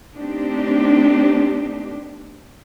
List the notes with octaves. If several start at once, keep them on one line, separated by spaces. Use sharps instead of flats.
A3 B3 C4 D4 D#4 G4